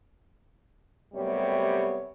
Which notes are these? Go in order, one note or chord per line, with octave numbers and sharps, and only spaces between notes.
F#2 C3 G3 A3 B3 C#5